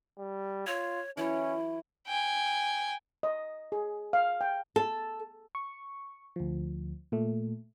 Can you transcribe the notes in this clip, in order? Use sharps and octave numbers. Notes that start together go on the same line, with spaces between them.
G3
F4 C#5
E3 F#3 C#4 E4 C#5
G5 G#5
D#5
G#4
F5
G5
A4
C#6
D2 F3
A#2 A3